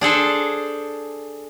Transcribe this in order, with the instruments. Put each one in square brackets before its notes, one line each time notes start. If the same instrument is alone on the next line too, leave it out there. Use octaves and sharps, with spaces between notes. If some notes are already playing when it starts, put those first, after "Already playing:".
[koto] D4 G#4 A4 C5